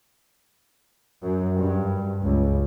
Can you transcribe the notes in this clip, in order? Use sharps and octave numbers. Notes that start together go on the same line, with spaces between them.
F#2
G2
C#2